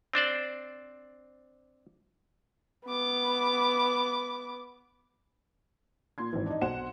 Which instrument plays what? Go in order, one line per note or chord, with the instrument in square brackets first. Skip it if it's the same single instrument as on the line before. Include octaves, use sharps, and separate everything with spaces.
[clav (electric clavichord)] C4 D4 C5 D5
[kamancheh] B3 D6
[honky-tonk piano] A#2 C6 G#6
G#1 E3
D4 D#4
B1 C5 F#5 E7